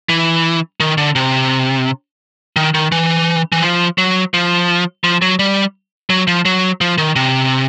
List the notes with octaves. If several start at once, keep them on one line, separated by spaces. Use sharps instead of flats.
E3
D#3
D3
C3
D#3
D#3
E3
E3
F3
F#3
F3
F3
F#3
G3
F#3
F3
F#3
F3
D#3
C3